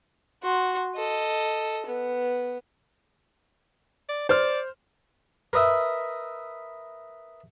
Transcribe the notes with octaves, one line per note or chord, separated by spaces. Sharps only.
F#4 C6
A4 D#5
B3
D5
C5 D5 F6
A#4 B4 D#5 E5